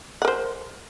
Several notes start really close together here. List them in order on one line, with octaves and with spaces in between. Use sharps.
F#5 A#4 C5